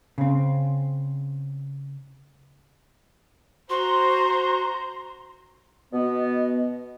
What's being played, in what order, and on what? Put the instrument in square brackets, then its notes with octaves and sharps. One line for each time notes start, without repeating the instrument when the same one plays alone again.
[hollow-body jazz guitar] C#3 C4
[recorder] F#4 [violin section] C5 A#5 [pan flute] C6
[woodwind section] B2 B3 [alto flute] D#5